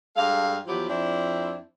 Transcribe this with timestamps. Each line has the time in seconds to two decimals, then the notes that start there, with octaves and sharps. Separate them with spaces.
0.15 G2 G#3 A4 F5
0.66 E2 F3 F#3 B3 E4 G4
0.89 F2 C4 D4 E4